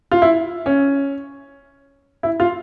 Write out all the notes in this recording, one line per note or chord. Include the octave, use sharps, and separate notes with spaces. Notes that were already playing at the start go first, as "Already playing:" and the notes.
F4
E4
C#4
E4
F4